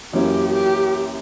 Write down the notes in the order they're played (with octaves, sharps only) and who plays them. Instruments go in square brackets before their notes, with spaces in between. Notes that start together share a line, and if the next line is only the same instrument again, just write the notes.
[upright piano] F#2 E3 A#3 C#4 [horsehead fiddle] G4
[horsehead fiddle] G4